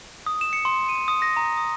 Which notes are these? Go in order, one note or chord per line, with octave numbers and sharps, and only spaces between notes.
D#6
E7
C#7
C6
D#7
D#6
A#6
A#5
D#6